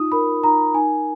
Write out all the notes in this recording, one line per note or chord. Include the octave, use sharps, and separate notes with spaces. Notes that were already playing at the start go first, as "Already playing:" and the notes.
Already playing: D#4 F4 D#6
A#4 B5
D#4 A#5
D#4 G#5